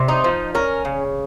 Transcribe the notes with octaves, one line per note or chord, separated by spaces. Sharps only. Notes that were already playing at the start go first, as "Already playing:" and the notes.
Already playing: C3
D#4
F3
C#4 A#4
C#3